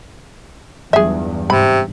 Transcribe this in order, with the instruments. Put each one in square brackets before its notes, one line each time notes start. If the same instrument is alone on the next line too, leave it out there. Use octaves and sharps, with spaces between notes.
[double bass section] E2 G2 [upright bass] F#3 F4 [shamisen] G#4 E5
[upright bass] G#2 [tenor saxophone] C3 [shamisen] B5